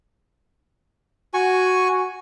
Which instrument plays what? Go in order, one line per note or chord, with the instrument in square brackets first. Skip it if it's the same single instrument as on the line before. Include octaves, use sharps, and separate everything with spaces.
[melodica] F#4 G#5 C#6